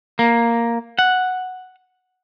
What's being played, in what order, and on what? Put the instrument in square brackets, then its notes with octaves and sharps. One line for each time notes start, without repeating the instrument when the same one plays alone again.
[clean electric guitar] A#3
F#5